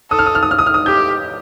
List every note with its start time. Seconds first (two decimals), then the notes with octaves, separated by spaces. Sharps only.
0.11 A4 D#6
0.19 F6
0.26 D#6
0.35 F6
0.43 D#6
0.51 F6
0.59 D#6
0.66 F6
0.74 D#6
0.86 G4 G6